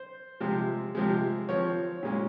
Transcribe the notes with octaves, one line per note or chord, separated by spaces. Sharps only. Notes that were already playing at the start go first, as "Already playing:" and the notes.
Already playing: C5
C3 F3 G#3
C3 F3 G#3
F3 C4 C#5
A#2 G#3 C#4